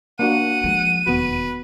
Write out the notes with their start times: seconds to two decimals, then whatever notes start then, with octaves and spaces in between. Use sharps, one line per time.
0.19 A#3 D4 F#4 F#5 D#7
0.64 F3 G#3
1.06 E1 D#2 B3 F#4 B4